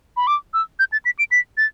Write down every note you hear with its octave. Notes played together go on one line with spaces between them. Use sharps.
B5
D6
E6
G6
A6
B6
D7
B6
A6